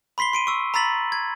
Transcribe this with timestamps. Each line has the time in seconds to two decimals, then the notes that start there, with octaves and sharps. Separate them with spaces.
0.18 B5 C6 B6 C7 G7
0.33 C6 D7 D#7
0.47 C#6 E6
0.74 A#5 B5 E6 A6 B6 F#7
1.12 G#6